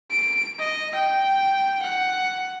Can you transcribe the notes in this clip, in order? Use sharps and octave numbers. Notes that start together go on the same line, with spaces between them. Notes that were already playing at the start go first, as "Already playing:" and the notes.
D7
D#5
G5
F#5